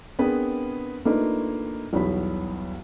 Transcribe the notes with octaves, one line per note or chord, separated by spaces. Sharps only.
B3 C4 D4 G#4 A#4 B4
A3 A#3 D4 D#4 F4 B4
B1 E2 G3 B3 C#5 B5